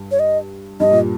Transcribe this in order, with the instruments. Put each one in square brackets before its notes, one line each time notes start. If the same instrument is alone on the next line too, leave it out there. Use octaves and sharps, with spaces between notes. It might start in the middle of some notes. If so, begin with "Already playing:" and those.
Already playing: [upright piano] G2
[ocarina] C#5
D#5
[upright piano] G2 [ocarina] D#5
[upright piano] A#2